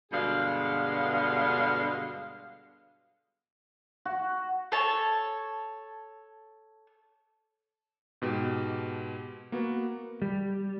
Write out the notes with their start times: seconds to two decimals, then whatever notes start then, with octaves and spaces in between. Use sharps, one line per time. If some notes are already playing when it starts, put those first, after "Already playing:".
0.12 G2 B2 D3 G#3 G#4 F5
4.05 F#4
4.72 A4 C#5 A5
8.22 G#2 B2 G4
9.52 A#3 B3 F#4
10.22 G3